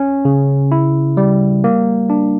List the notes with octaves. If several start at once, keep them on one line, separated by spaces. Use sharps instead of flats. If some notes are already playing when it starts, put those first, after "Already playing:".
Already playing: C#4
C#3
E4
G3
A#3
D4